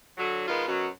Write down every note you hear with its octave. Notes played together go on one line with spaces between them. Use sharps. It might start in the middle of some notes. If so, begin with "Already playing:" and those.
D3 F#3
D#3 G#3 B3 F4
F#2 B2 F#3